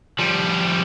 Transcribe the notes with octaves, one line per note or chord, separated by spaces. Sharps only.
F3 G3